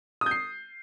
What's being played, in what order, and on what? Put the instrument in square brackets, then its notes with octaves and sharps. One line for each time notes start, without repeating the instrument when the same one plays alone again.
[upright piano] D#6
G6
C7